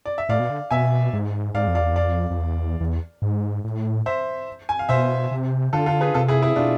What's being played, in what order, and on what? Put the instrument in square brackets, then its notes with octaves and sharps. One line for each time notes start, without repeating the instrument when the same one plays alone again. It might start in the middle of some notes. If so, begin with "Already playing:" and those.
[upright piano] D5
E5
[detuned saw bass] A2 [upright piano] D5 F5
[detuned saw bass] B2
D3
[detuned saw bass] B2 [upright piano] E5 G#5
[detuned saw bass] G#2
[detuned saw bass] G#2 [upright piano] D5 F5
[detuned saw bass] F2
[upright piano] D5 F5
[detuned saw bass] E2
[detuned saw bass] F2 [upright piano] D5 F5
[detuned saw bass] F2
E2
E2
G#2
A2
[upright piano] C5 E5
G#5
F5
[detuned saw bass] B2 [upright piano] C5 E5
[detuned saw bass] C3
[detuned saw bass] D3 [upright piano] F4 A4
[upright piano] F4 A4
G#4 B4
[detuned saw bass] C3 [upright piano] F4 A4
[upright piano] E4 G#4
E4 G#4
[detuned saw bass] B2 [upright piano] D4 F4